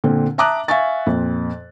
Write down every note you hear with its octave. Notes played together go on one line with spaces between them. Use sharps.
A#2 D3 C4
E5 A5 A#5 D6 D#6 F#6
E5 F5 G#5 C#6 A6
F2 A#2